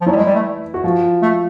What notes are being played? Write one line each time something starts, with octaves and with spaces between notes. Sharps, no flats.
F3
E3 F#3 E4
G3
G#3
G3
A3
F#4
F3 F4
A3